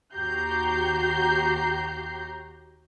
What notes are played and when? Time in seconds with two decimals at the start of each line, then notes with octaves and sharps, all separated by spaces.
0.15 D#2 F#4 G4 A#5 G6 C7